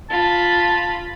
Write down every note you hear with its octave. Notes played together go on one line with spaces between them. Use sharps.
F4 A5 B5